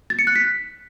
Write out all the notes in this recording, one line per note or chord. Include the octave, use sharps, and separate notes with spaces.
A6
C#7
F#6
B6